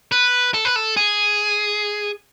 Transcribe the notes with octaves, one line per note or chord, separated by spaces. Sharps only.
B4
A4
B4
A4
G#4